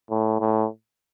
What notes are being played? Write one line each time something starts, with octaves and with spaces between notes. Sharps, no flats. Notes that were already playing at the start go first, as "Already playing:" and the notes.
A2
A2